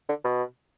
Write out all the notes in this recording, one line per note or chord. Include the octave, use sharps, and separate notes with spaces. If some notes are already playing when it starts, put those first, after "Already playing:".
D3
B2